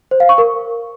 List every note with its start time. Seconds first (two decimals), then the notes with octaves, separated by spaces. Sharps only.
0.11 C5
0.20 F5
0.29 C#6
0.38 A#4